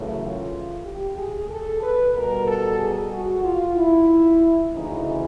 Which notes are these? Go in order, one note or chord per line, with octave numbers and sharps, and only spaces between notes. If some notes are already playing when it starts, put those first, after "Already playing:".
Already playing: F#2 C#3 E3 A3
F4
G4
G#4
A4
B4
B2 G3 A#4
A4
G#4
F#4
F4
E4
D2 C#3 E3 D#4